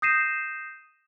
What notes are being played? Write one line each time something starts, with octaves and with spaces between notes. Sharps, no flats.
D#6 G6 A#6 C7 D#7 E7